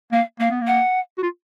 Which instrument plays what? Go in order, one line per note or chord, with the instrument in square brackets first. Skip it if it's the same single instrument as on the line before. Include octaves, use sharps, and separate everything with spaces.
[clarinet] A#3 [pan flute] F5
[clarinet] A#3 [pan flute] F5
[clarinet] B3
A#3
[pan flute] F#5
[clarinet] F#4
F4